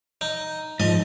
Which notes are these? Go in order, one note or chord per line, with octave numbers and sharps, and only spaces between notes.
D#4
G#2 F3 D#5